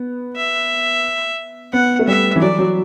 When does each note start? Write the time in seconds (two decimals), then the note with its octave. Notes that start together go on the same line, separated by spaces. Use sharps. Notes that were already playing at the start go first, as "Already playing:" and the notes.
Already playing: B3
0.36 E5
1.72 B3 F#5
1.99 A3
2.08 G3 E5
2.36 E3
2.41 F#3 D5
2.59 F#3